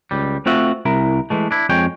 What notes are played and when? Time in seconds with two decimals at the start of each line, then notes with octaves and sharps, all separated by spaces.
0.11 C#2 G3
0.46 A3 C4 F4 F#4 E5 F#5
0.85 C2 E4 A#4
1.30 E3 G#3 A3
1.51 D4 E4
1.69 F2 G#3 C#5 G5